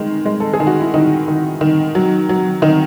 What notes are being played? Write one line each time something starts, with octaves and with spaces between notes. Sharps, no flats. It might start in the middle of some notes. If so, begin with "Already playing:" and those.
Already playing: D#3 G#3
G#3
A4
G#4
D#3
F#4
E4
D#3 D#4
D#3
D#3
F#3
F#3
D#3 D#4